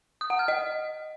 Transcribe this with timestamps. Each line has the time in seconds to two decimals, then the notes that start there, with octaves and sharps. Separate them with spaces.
0.21 D#6
0.30 F#5
0.39 F6
0.48 D#5